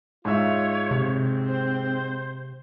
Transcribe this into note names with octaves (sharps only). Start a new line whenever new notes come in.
G#2 F4 C#5 E5
C3 C4
C5